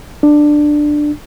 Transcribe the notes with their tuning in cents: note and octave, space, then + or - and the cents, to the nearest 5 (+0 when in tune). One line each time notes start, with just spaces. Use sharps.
D4 +15